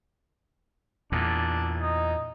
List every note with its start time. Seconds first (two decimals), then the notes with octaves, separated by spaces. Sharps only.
1.12 E2 A#2 D4
1.80 D#4